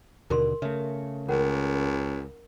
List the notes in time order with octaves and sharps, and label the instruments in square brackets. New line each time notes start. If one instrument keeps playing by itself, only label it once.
[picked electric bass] D#2 B2 D3 [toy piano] A#4 C6
[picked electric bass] C#3 A3 [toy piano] E5
[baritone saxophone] C#2 [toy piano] C#4 A#4 F#5